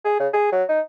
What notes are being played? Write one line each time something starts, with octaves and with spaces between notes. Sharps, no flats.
G#4
C#3
G#4
F#3
D#4